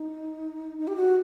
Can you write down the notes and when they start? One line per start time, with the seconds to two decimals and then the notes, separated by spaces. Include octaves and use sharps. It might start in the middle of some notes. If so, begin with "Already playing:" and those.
Already playing: D#4
0.78 D#4
0.87 G4
0.96 F#4